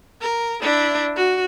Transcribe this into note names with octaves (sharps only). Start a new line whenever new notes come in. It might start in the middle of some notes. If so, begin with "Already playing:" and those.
A#4
D4 E4
F#4